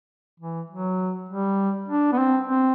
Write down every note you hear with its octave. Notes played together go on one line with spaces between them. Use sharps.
E3
F#3
G3
D4
B3
C4
C4